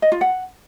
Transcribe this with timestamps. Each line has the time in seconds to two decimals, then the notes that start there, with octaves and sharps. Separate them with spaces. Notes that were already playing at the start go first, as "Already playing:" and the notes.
0.02 D#5
0.12 F4
0.21 F#5